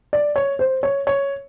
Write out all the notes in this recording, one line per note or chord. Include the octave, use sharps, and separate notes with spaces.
D5
C#5
C5
C#5
C#5